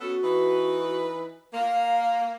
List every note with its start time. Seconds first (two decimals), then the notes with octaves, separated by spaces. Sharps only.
0.01 B3 C#4 F#4 A4
0.24 E3 D#4 B4
1.54 A#3 F5